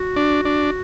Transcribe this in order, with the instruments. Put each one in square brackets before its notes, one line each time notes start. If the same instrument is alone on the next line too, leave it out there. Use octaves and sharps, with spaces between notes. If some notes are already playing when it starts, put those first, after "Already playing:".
Already playing: [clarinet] F#4
[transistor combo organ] D4
D4